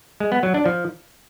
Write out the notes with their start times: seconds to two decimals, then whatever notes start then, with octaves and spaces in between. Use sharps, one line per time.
0.20 G#3
0.32 B3
0.43 F#3
0.54 D4
0.66 F3